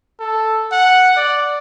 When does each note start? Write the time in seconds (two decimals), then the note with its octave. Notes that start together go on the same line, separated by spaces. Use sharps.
0.20 A4
0.72 F#5
1.17 D5